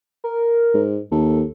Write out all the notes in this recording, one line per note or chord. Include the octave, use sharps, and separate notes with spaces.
A#4
G#2
D#2 A4